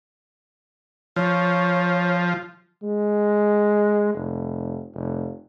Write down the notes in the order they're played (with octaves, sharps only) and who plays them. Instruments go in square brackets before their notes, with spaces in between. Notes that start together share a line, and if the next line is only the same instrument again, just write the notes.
[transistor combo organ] F3 [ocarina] C#5
[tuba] G#3
F1
F1